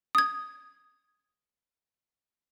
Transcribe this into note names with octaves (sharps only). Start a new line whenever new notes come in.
D#6 G#6